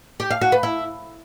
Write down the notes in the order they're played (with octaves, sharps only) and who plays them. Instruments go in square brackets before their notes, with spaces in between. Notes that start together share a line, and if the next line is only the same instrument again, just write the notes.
[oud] G4
F5
F#4
B4
E4